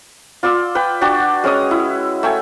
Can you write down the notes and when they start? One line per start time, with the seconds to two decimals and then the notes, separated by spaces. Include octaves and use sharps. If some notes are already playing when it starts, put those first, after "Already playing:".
0.43 F4 D5 C6 E6
0.75 B4 G5
1.01 D4 F#4 G5
1.44 G#3 C#4 C#5 D#6
1.71 E4
2.23 A3 G5 G#5